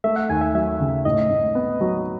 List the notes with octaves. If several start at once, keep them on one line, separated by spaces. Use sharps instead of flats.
A3 E5
F#5
D#2 G#5
E5
F#3 E5
C#3
A2 D#5
A2
B3
F#3